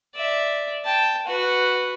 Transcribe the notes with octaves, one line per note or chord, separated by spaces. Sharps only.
D5 E5
G5 A5
F#4 B4